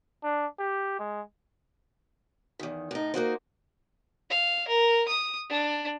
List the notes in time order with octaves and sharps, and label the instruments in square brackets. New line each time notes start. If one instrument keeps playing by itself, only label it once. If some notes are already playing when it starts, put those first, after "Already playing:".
[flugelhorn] D4
G4
G#3
[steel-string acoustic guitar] E2 D#3
A2 D#4
A#3 D#4 F#4 C5
[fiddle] F5
A#4
D#6
D4